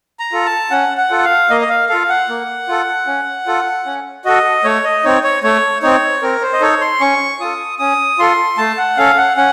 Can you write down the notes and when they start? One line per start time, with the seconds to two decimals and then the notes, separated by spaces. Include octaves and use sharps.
0.19 A#5
0.32 F4 A4
0.45 A5
0.71 C#4 F#5
0.98 F#5
1.11 F4 A4
1.24 F5
1.50 A#3 D#5
1.61 D#5
1.70 F5
1.89 F4 A4 F5
2.09 F#5
2.29 A#3
2.69 F4 A4
3.07 C#4
3.46 F4 A4
3.86 C#4
4.25 F#4 A4 D#5
4.64 A3 C#5
4.84 D#5
5.04 C4 D#4 C#5
5.24 C#5
5.43 A3 C#5
5.82 C4 D#4 C#5
6.22 C4 A#4
6.42 C5
6.53 D#5
6.61 D#4 A4 C#5
6.81 C6
7.00 C#4 C#6
7.40 F4 A4 D#6
7.79 C#4 D#6
8.18 F4 A4 C6
8.57 A3 A5
8.78 F#5
8.97 C#4 A4 F5
9.17 F#5
9.37 C#4 F#5